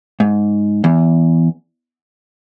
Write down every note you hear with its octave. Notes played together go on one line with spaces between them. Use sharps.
G#2
E2